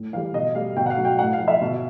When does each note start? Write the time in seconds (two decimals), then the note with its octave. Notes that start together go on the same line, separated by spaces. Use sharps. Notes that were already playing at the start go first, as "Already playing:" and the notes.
Already playing: A2
0.13 E3 F5
0.17 G3
0.34 B2 D#5
0.55 G3 F5
0.77 B2 G5
0.86 F#5
0.90 F5
0.97 F#3
1.05 G5
1.19 A2 F#5
1.33 F5
1.40 F3
1.48 E5
1.61 B2